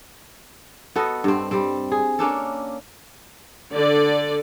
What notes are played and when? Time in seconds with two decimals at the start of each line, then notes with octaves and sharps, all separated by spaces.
0.96 B3 F#4 A4 D#5
1.24 G2 C4
1.51 G3 C4
1.92 G#4
2.19 A#3 C#4 D4 A4
3.73 D3 D5